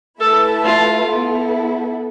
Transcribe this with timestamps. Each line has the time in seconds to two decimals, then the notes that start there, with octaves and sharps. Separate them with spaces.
0.20 A3 E4 A4 B4 E5 A5
0.64 F4
1.07 B3 E4 A4